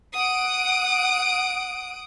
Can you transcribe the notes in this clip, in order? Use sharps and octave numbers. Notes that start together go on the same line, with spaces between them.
F#5 D#6 D7